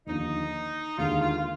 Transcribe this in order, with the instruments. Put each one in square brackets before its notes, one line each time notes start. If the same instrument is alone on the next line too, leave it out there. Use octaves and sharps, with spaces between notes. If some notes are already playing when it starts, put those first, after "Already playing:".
[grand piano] D#2 D3 F3 A#3 [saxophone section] D#4
[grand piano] D#2 D3 G#3 D4 [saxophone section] F4
[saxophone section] F4
F4